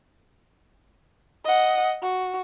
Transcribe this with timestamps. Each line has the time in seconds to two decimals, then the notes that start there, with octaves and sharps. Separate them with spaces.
1.45 D#5 F#5
2.02 F#4